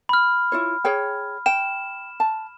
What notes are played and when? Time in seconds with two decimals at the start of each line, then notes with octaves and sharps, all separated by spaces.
0.09 B5 F6
0.52 E4 F4 C#5
0.84 G#4 C#5 G5
1.46 G5 E7
2.20 A5